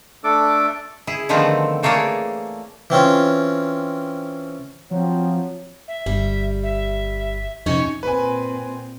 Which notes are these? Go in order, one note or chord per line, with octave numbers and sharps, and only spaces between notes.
A3 D4 A4 D6
E4 G#4
D3 D#3 F3 A3 B3 C4
E3 A3 A#3 G#4 C#5 D5
E3 C4 C#4 F4
F3 F#3 C4
E5
G1 G3
E5
F2 C3 C#4 D#4 C#6
A#2 C4 B4 G#5